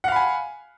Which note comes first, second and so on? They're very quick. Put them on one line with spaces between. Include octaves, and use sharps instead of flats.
F#5 F5 B5 G#5